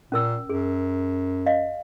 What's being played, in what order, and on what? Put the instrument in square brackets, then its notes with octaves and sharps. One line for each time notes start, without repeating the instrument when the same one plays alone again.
[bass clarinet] A#2 [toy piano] C#4 A#4 E6
[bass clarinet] F#2 [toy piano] G#4
[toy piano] D#5 F5